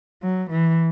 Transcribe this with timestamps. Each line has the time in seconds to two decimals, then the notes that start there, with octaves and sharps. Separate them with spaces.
0.23 F#3
0.50 E3